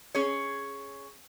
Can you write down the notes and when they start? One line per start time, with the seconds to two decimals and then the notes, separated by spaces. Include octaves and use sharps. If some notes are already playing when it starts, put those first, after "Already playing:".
0.15 C#4 G#4 C#5